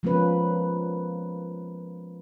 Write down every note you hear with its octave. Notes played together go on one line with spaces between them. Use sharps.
F3 G#3 A#3 B3 C#4 B4